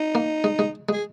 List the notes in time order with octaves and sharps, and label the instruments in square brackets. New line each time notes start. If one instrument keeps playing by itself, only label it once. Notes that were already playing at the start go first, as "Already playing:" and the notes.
Already playing: [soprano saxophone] D#4
[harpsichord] A#3
G#3
G#3
[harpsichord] G#3 [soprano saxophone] G#4